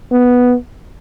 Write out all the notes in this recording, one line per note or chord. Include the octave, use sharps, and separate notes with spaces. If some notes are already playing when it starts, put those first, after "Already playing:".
B3